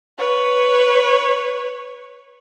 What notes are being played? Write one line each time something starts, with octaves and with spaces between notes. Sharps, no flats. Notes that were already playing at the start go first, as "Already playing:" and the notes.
B4 C#5